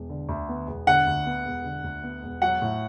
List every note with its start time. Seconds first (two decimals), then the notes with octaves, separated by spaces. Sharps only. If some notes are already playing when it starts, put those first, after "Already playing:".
Already playing: E1
0.10 D3
0.29 D2
0.49 B3
0.67 E1
0.87 D3 F#5
1.07 D2
1.26 B3
1.45 E1
1.64 D3
1.84 D2
2.04 B3
2.23 E1
2.42 F#3 F#5
2.62 A2